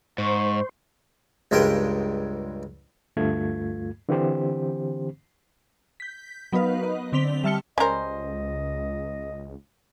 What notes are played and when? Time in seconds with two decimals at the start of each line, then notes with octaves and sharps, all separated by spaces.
0.18 G#2 C5 C#6
1.51 C#2 G2 G#3 A#4 G5
3.17 D2 G2 A3 F4 G#6
4.09 D3 E3 C4 G4 C5
6.00 G6 B6
6.52 F#3 B3 D#4 A#4 B4 F5
6.83 D#5
7.12 D3 C4 D5 B6 F7 G7
7.43 G3 E5 A5 F6 C#7 G7
7.78 C#2 G3 C#4 A#4 C5 D#5